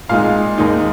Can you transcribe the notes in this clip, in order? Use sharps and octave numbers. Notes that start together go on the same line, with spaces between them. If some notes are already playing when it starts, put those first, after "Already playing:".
A#2 G#3 D#4 F5
D#2 D#3 G#3 D#4